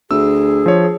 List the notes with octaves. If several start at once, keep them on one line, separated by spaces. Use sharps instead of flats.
D2 G#4 E6
F3 C#5